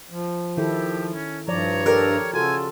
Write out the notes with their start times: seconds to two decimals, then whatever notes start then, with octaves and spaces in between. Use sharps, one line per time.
0.10 F3
0.57 D#3 E4 G4 A4
1.12 C#4
1.48 G2 F3 C#5 D5 A#5
1.86 G4 A4 A#4 D5
2.34 C#3 F4 F#4 A4 G#5